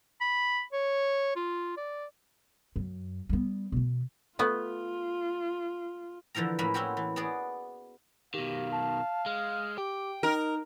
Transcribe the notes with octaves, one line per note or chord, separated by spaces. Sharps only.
B5
C#5
F4
D5
F#2
G3 B3
B2 E3
A3 B3 F4
D3 E3 F3 A#4 A#5
A2 A#3 C#4 B4 B5
C4 C#4 E4 F#4 G4
E3
B3 F#4 G#4 D5
B2 D#3 G4 F5
A5
G#3 F6
G4 G5 D6
D#4 A#4 D#5